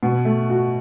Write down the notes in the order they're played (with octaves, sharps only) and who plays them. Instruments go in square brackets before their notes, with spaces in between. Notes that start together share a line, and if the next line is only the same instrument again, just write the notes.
[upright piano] B2
A3
F#4